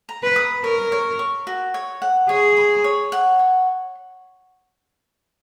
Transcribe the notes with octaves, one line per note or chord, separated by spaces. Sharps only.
A#5
B4
D#6
A#4 C#5
C#5
C#6
F#4
C#5
F#5
G#4 C#5
B5
C#5
F#5
C#5